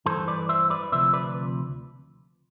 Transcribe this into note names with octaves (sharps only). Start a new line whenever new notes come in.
G2 E3 A4 C5
B4 D5
C5 E5
B4 D5
D2 C3 F3 C5 E5
B4 D5